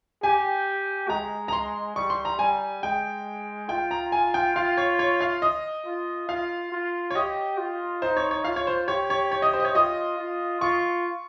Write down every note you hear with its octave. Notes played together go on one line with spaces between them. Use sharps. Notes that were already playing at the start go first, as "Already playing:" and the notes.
G4 G#5
G#3 A#5
A#5
C6
G3 C#6
C6
A#5
G3 G#5
G#3 G5
F4 G5
A#5
G#5
G5
F4 F5
C#5
C#5
F5
D#5
F4
F4 F5
F4
C#5
G4 D#5
F4
D#4 C5
C#5
C#5
F4 F5
C#5
C5
G4 C#5
C#5
C#5
D#5
C5
D#5
C#5
F4 D#5
F4
F4 C#6